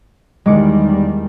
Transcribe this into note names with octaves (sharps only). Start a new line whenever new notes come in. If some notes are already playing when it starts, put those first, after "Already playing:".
E2 D#3 G3 G#3 D6 C#7